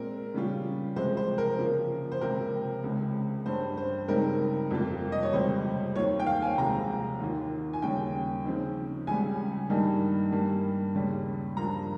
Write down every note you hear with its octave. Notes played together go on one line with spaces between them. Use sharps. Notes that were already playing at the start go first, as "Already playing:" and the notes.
Already playing: A#2 G#3 C4 A#4
C#3 G3 C#4 F4
C3 F3 G#3 C5
C5
A#4
C#3 F3 A#3 F4
C5
C#2 C3 F3 C4 A#4
C#2 C#3 G#3
G2 G3 C#4 C5
C5
C#2 C#3 G3 C4 D#4 A#4
F2 C3 G3 A#3 F4
D#5
C#5
C#2 C3 G3 C5
D#2 D#3 A#3 F4 C#5
G5
F5
G#5
C2 C3 F3 G#3 C4 A#5
D#2 D#3 A#3 F4
G#5
D#2 C#3 G3 A#3 C#4 G5
C#3 F3 C4 D#4
C#2 C#3 G3 G#5
G2 D#3 G3 A#3 D#4
G2 G3 A#3
D#2 C#3 G3
G2 F3 A#3 F4 A#5